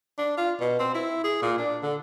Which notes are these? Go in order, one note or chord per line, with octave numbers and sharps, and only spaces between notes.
D4
F4
B2
C4
E4
G#4
A#2
D4
D3